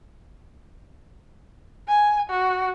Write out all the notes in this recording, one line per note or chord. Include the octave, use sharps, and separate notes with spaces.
G#5
F#4